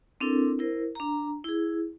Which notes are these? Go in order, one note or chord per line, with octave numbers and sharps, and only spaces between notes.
C4 D4 E4 A4 A#4
E4 A#4 C5
D4 A#5
E4 G#4